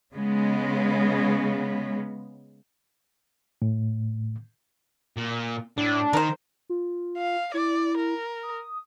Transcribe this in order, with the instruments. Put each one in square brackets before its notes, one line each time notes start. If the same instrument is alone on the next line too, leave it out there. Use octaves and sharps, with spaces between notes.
[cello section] C#3 G#3 B3
[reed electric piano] A2
[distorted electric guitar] A#2
[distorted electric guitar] A2 [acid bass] D4
[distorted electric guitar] D#3 [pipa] A#4 C5
[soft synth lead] F4
[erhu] F5
[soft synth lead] E4 [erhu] D5
[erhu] A#4
[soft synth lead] D#6